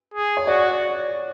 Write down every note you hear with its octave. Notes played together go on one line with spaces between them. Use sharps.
G#4
C#5
F#4 D5